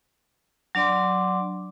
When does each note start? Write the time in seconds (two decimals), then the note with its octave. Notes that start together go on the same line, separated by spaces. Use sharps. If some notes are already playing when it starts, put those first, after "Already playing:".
0.75 F#3 D4 D5 C6 D6